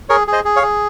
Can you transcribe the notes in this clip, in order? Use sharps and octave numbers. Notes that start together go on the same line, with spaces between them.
G#4 A#4 C#5
G#4
C5 D#5
G#4
C#5 F5
G#4